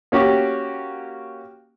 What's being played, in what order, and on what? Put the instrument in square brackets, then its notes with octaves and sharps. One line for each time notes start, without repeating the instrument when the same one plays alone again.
[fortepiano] A#3 C#4 F#4 G4